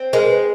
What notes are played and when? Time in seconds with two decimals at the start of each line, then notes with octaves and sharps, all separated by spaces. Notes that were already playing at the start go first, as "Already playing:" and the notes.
Already playing: C4
0.13 G#3 A#4
0.29 B4